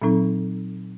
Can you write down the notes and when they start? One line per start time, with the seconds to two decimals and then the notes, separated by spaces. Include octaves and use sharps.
0.02 A#2 F#3 C4 D#4 A4